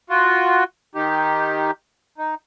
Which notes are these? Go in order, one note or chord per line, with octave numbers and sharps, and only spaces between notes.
F4 F#4
D#3 D#4 G4
D#4